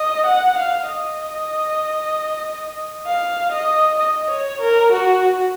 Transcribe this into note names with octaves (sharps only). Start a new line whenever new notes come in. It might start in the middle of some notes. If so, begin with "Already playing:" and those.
Already playing: D#5
F#5
F5
D#5
F5
D#5
D#5
C#5
A#4
F#4